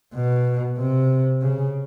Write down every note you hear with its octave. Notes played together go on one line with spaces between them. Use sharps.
B2
C3
C#3